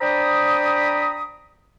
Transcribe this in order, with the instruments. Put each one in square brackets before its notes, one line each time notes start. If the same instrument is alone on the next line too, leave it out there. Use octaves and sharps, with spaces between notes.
[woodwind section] D4 C5 G5 A#5 B5 D#6